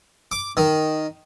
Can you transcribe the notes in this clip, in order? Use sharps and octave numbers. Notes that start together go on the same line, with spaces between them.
D6
D#3